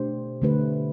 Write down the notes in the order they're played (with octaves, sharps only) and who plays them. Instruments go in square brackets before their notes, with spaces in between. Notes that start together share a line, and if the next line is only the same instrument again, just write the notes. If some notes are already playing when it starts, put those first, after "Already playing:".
Already playing: [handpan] B2 A3 D4 G4 C5
D3 A3 D4 G4 B4